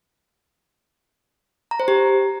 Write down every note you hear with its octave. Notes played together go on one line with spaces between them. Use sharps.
A#5
C5
G4